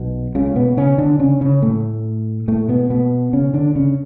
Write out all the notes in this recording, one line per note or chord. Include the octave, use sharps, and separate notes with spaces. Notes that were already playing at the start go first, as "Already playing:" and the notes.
Already playing: B1 B2
C#2 C#3
B2 B3
C#3 C#4
D3 D4
C#3 C#4
C#3 C#4
A2 A3
A2 A3
B2 B3
B2 B3
C#3 C#4
D3 D4
C#3 C#4